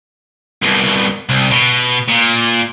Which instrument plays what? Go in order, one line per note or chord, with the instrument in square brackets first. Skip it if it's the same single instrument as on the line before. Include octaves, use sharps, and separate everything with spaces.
[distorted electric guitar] C2 B2
C2
B2
A#2